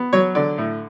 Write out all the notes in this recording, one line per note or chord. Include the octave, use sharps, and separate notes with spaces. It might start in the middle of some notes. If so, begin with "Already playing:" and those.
Already playing: B3
F#3 C#5
D3 D5
A2